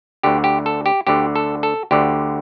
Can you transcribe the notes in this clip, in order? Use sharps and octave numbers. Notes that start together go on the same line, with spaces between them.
D2 D3 G4
G4
A4
G4
D2 D3 G4
A4
A4
D2 D3 G4